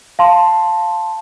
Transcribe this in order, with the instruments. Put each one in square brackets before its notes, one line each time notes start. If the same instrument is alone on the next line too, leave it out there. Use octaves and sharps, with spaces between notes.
[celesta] F5 A5 C6